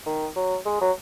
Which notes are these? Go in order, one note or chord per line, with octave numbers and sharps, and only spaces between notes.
D#3
F#3
G#3
F#3